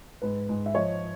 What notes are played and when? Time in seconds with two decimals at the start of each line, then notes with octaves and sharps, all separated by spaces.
0.22 G#2 B4
0.49 G#2
0.66 E5
0.75 F3 C#5 D#5